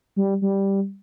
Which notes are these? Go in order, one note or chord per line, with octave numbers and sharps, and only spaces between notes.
G3
G3